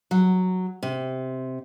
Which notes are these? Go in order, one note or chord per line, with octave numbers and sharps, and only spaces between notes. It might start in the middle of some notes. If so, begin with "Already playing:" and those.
F#3
C3